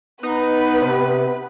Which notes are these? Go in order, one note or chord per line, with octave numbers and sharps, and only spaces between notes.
B3 D#4 B4
C3